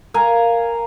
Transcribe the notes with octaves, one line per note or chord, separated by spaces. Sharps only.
A#4 F5 G#5 A#5